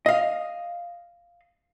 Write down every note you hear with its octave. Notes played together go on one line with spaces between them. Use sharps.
D#5 F5